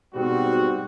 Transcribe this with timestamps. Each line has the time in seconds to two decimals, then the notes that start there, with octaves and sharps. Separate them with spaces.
0.14 G#2 B2 G3 C4 F#4